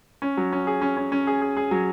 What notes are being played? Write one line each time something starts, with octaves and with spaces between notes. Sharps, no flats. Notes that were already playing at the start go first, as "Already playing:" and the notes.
C#4
F#3
C#4
G#4
C#4
C#4
C#4
G#4
G#4
G#4
F#3